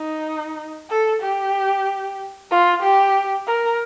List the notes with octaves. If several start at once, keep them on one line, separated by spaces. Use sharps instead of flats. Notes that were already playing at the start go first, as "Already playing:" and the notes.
Already playing: D#4
A4
G4
F4
G4
A#4